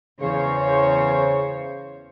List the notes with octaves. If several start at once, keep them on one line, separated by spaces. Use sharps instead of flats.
E2 C#3 C5 C#5